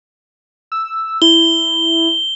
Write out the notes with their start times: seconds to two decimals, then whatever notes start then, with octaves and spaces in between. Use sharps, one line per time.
0.72 E6
1.22 E4 G7